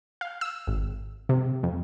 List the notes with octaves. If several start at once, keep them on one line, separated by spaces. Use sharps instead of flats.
F5
E6
G#1
C3
F2